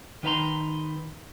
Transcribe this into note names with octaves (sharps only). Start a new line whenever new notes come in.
D#3 D#4 B4 F5 A#5 C6